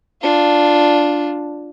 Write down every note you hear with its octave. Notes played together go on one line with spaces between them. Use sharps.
D4 F4